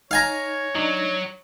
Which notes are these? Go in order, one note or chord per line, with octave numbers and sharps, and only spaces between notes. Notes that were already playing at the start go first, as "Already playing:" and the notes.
D#4 C#5 F5 G#5 A#5
F#3 D4 D#4